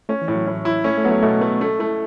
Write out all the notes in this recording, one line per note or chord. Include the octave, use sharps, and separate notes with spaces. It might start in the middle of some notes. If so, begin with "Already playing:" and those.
A3 C#4
E3
A2
F#3
A2
E4
A3 C#4
A3
F#3 B3
A3
B2 A3
A3 B3
A3 C#4
A3 E4